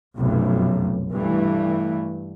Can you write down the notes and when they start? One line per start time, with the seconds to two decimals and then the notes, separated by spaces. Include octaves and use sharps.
0.16 F1 B1 F#2
1.11 G2 E3 A3